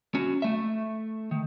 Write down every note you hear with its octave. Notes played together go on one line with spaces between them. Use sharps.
C#4 F#4
A3 E5
D#3